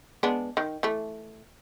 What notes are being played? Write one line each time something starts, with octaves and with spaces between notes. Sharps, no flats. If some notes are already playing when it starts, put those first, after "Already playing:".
G#3 B3 D4
D#3
E3 A3